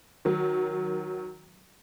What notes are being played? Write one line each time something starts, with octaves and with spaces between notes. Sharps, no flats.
D#3 F#3